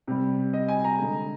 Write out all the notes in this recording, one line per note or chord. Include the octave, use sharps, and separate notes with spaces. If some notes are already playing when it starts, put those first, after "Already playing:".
C3 G3
D#5
G#5
A#5
D3 G#3